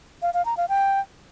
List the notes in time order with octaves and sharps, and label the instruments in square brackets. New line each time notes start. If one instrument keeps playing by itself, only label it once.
[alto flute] F5
F5
A#5
F5
G5